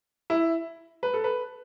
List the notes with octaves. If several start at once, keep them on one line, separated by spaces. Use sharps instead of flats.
E4
B4
A4
B4